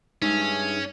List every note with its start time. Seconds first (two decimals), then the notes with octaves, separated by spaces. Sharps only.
0.22 G2 G#3 C#4 D#4 G#4 E5